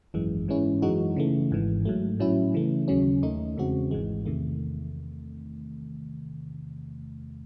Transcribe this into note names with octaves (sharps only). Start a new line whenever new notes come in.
G#1 F#2 E3 G#3
G#2 E3 G#3 C#4 E4
F#2 E3 G#3 D#4 F#4
C#3 E3 A3
G#1 G#2 E3
G#2 F#3 A3
A2 F#3 C#4 E4
C#3 E3 A3
D#2 C#3 F#3 C#4
D#2 D#3 A3 D#4
E2 C#3 G#3 C4 F#4
G#1 G#2 E3 G#3
E2 C3 D#3 A3